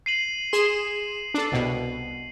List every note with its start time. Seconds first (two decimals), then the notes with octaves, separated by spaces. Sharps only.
0.06 C7 D#7 F#7
0.53 G#4 C6 E7
1.34 D4 A4
1.52 C2 B2